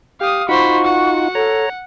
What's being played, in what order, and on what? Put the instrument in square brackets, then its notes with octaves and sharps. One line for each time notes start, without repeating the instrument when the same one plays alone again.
[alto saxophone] G4 [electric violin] F5 D#6
[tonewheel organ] D#4 F4 [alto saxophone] F#4 [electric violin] C5 B5 [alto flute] C#6
[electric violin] F#5
[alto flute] A4 [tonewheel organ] C#5 A#5